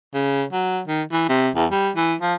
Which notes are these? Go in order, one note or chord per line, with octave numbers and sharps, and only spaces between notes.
C#3
F#3
D#3
E3
C3
E2
G3
E3
F3